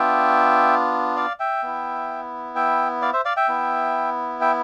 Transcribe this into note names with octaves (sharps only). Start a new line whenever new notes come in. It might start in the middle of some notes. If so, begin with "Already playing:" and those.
Already playing: B3 D4 F4 E5 G5
D5 F5
E5 G5
B3 E4
E5 G5
D5 F5
C5 E5
D5 F5
E5 G5
B3 E4
E5 G5